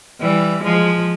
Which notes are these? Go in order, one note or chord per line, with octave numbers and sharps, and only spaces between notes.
E3 G3
F3 G#3